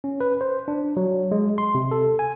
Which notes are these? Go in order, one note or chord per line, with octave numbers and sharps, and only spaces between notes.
C#4
B4
C5
D4
F#3
G#3
C6
C3
A4
G#5